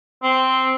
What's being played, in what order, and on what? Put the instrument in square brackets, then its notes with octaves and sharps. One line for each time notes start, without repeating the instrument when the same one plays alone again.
[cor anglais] C4